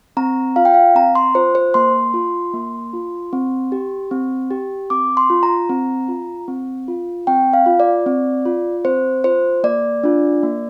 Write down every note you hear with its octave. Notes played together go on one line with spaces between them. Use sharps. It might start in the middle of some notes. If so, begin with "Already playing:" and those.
C4 A#5
F4 F5
G5
F5
C4 A#5
C6
F4 C5
C5
A#3 C6
F4
A#3
F4
C4
G4
C4
G4
C4 D6
C6
F4
A#5
C4
F4
C4
F4
C4 G5
F5
F4
D5
C4
F4
C4 C5
F4 C5
A#3 D5
D4 F4
A#3